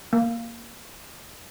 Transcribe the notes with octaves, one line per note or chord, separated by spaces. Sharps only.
A#3